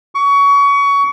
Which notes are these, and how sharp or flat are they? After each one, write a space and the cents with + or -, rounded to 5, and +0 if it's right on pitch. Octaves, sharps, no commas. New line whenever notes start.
C#6 +25